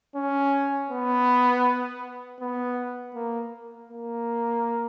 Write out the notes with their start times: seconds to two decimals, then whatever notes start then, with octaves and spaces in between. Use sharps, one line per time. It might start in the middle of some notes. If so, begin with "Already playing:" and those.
0.15 C#4
0.90 B3
2.40 B3
3.15 A#3
3.90 A#3